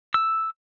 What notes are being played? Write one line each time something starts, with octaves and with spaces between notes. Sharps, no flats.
E6